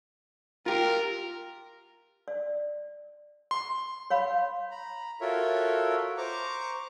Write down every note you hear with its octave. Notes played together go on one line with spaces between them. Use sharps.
F4 G4 A#4
D5
C6
C#5 F5 B5
A#5 B5
F4 F#4 A4 A#4 C#5 E5
C5 A#5 C#6 D6